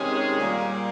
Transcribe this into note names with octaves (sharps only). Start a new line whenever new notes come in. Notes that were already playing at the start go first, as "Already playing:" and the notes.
Already playing: C3 D#3 G#3 C#4 G#4
A#2 G3 A#3